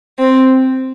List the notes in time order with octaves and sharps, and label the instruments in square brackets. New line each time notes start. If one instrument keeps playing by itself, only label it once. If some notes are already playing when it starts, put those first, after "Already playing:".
[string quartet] C4